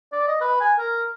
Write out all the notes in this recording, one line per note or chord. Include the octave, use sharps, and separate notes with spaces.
D5
D#5
B4
G#5
A#4